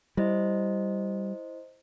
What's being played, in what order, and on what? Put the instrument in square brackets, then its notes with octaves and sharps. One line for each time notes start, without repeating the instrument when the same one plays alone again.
[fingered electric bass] G3 [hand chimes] E4 C5 D#5